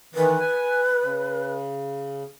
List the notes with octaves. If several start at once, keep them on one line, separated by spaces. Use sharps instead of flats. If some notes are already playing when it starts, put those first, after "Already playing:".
D#3 E3 B4
G#5
C#3